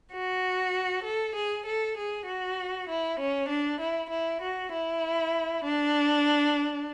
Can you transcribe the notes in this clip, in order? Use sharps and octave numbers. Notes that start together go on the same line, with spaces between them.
F#4
A4
G#4
A4
G#4
F#4
E4
C#4
D4
E4
E4
F#4
E4
D4